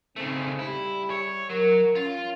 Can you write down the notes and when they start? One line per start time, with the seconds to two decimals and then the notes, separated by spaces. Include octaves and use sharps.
0.16 C#3 A3 C4 D#4
0.59 G3 E4 G4
1.10 C#5
1.50 F#3 A#4
1.95 C#4 F4